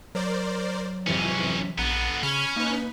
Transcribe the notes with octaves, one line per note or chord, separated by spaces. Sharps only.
F#3 A#4 C5 D5
F2 G#2 C3 E3 C#4
A#1 D3 B3 A#5
C#3 C#4 B5 F6 G#6
A#3 D#4 B4